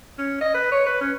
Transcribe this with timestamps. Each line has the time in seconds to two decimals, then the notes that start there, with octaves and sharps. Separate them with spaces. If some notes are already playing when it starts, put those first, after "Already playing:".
0.19 C#4
0.41 D#5
0.54 B4
0.72 C#5
0.86 B4
1.01 C#4